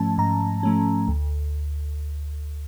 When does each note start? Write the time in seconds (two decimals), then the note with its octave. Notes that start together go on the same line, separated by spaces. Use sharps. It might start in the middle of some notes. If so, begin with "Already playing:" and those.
Already playing: G#2 F3 A3 C#4 A5
0.18 G#2 A#5
0.63 F3 A3 C#4
1.08 D2